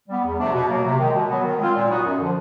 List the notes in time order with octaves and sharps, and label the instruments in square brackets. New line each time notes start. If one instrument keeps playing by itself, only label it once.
[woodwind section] G3 B3
E2
C3 F3 A3 D4
B2
F#3 A#3
C3
D#3 G#3
B2
F#3 B3
D#3
G#3 C4 F4
A#2
F#3 B3 D#4 F#4
F#2
D3 F3